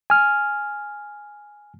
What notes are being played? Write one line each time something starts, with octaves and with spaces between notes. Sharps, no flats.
G#5 F6